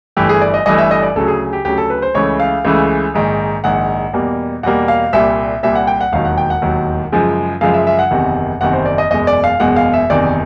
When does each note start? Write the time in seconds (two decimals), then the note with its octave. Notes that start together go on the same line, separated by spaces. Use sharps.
0.17 G1 G2 E3 A3 G4
0.29 G#4
0.41 D5
0.54 D#5
0.66 G1 G2 E3 A3 D#5
0.78 E5
0.91 D#5
1.03 D5
1.16 D2 C#3 F#3 A4
1.28 G#4
1.53 G4
1.65 D2 C#3 F#3 G4
1.78 A4
1.90 B4
2.02 C5
2.15 C#2 C#3 E3 A3 C#5
2.40 F5
2.65 C#2 C#3 E3 A3
3.14 A#1 G#2 D#3
3.64 A#1 G#2 D#3 F#5
4.14 E2 B2 G3 A#3
4.63 E2 B2 G3 A#3 F#5
4.88 F5
5.13 C2 A#2 G3 E5
5.63 C2 A#2 G3 E5
5.75 F#5
5.87 G5
6.01 F#5
6.12 E1 D#2 D#3 F#3 F5
6.25 F#5
6.38 G5
6.50 F#5
6.62 E1 D#2 D#3 F#3
7.12 F#2 C#3 F3 G#3
7.61 F#2 C#3 F3 G#3 F5
7.74 E5
7.87 E5
7.99 F#5
8.11 F#1 E2 C3 D#3
8.61 F#1 E2 C3 D#3 F#5
8.73 C5
8.86 D5
8.98 D#5
9.10 F#1 E2 B2 G#3 D#5
9.27 D5
9.44 F5
9.60 F#1 E2 B2 G#3 F#5
9.76 F5
9.93 E5
10.10 F#1 E2 C3 D#3 D5